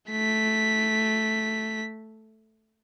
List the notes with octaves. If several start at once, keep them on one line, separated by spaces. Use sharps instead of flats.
A3 B6